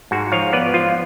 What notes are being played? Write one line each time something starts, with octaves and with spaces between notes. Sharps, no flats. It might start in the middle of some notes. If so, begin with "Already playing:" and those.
G#2 F#4
F3 C#5 F5
B3 B4 D5
F3 F4